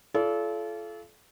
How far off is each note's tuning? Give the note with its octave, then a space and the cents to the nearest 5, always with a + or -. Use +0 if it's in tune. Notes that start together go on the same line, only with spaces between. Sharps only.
F4 -35 A4 -30 D5 -35